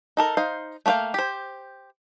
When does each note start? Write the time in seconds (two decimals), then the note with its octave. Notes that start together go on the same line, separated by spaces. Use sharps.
0.17 D#4 A4 A#4
0.37 D#4 C5 F5
0.86 A3 A#3 F#4 F5 G5
1.14 G4 C5